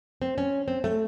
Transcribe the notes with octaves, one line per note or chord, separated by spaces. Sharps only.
C4
C#4
C4
A3